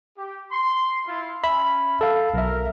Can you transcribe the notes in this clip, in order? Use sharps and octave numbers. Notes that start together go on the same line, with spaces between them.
G4
C6
E4 F4
C#4 E5 B5
A4 F5
B1 A#4 E5